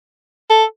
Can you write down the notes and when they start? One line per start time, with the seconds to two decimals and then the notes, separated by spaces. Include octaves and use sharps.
0.50 A4